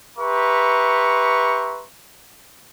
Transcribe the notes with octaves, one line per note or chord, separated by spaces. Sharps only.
G4 B4 E5 A#5 C6 C#6